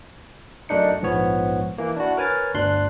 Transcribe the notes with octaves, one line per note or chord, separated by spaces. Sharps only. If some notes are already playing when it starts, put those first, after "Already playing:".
F#2 A3 D4 D#4 C#7
A#1 G#2 F3 B3 C#5
E3 A#3
D4 E4 F#4
A#4 B4 C#5 G#5 F6 A6
G1 D2 D4 C6 F#6